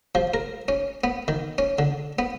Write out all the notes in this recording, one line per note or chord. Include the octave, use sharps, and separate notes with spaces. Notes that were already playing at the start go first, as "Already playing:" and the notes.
F3
A#4
C#4
B3
D#3
C#4
D3
B3